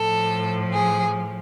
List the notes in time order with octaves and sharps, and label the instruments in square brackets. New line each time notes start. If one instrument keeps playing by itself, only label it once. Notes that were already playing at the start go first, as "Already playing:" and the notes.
Already playing: [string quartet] A2 F3 A4
G#4